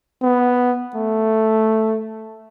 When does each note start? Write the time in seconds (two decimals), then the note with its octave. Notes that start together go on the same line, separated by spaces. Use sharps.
0.22 B3
0.95 A3